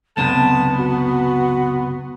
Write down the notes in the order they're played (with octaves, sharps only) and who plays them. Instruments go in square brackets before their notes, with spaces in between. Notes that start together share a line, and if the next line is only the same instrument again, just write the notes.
[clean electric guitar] C#2 F#2 C3 [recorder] B3 [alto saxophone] A5
[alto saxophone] F#4